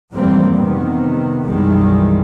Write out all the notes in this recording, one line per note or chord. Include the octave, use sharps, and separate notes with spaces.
F1 G#2 E3 G3 A#3 C4
C3 D#3 B3
B1 F#2 D#3 E3 G3 G#3